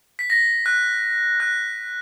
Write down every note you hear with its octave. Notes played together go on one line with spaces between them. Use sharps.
B6
A#6
F#6
F#6